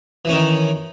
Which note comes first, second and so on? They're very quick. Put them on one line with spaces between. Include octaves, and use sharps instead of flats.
E3 C#4 D#3